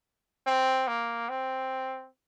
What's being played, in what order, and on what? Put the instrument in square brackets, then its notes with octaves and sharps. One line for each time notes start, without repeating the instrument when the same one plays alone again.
[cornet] C4
A#3
C4